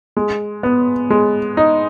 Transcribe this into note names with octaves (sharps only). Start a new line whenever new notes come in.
G#3
B3
G#3
D#4